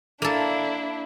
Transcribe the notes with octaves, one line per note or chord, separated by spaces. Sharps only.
A#3 D4 E4 A4